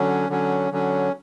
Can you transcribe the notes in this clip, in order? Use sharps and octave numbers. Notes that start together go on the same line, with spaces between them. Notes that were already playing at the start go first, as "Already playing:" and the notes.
Already playing: D3 F#3 C#4
D3 F#3 C#4
D3 F#3 C#4